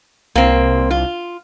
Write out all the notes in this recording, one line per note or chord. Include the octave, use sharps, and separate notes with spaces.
C2 A#3 C4
F4